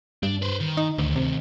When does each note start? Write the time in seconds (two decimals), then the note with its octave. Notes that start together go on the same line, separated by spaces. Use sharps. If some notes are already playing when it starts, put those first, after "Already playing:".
0.23 G2 D4
0.42 B4 C5
0.60 D#3
0.77 D#4
0.99 D2 A2 D#3
1.16 C3